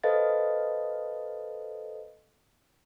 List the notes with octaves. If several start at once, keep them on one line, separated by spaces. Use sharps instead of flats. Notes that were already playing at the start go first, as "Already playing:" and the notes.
A4 B4 C5 D#5 F5 A6